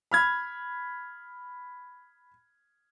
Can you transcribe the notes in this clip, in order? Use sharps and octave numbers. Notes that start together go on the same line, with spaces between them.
B5 F6 G#6